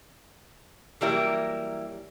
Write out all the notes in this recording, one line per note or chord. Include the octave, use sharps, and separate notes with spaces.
E3 F#3 G3 A#3 E4 A#4